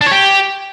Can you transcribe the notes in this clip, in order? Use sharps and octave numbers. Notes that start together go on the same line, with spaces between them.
D4
C#5
G4